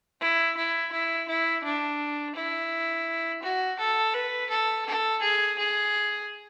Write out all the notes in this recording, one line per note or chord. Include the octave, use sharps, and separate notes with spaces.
E4
E4
E4
E4
D4
E4
F#4
A4
B4
A4
A4
G#4
G#4